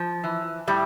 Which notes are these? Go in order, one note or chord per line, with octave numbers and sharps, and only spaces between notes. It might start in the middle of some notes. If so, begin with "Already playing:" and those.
Already playing: F3
E3
A2 G3